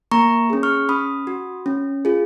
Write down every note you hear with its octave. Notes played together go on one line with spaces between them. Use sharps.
A#3 A#5 C#6
C#4 G#4
C#6 F6
C#4 B5 D#6
F#4
C#4
F4 G#4